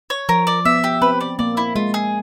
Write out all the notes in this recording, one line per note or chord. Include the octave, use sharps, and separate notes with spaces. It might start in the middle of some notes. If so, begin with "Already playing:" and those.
C#5
F3 A#4
D5
B3 E5
G4
C4 B4
D5
A#3 D5
E4
G#3 F4
G#4